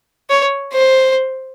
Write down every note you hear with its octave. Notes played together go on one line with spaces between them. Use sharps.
C#5
C5